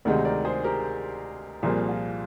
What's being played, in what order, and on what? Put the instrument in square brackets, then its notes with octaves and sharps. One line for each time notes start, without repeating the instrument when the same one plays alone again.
[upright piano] D2 C3 D#3 G#3 D#4 [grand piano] A#4 D5
[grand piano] A#4 D5
G#4 C5
G4 A#4
[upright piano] C2 A#2 F3 A#3 [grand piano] F4 G#4
[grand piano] F4